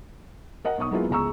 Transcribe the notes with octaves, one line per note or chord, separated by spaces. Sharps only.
A#4 D#5 F#5
B1 D#4 C#6 D#6
F#3 G#3 A#3 B3 E4 F4
G1 C#2 G#3 A#5 C#6 E6